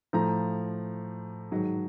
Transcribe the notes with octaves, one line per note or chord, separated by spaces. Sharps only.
A2 F3 A#5
G#2 D#3 F#3